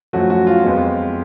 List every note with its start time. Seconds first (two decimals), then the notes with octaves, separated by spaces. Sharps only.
0.13 F#2 F3 A3 F#4
0.30 F#4
0.47 F4
0.64 F2 F3 G#3 B3